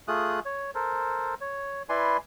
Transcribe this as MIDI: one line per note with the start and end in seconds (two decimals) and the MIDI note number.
0.08 0.40 57
0.08 0.40 65
0.08 0.40 68
0.08 0.40 87
0.08 0.40 90
0.45 0.71 73
0.75 1.34 69
0.75 1.34 70
0.75 1.34 72
1.41 1.83 73
1.89 2.17 64
1.89 2.17 71
1.89 2.17 74
1.89 2.17 80
1.89 2.17 84